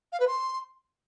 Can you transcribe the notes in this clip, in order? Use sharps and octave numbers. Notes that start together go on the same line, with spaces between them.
F5
B4
C6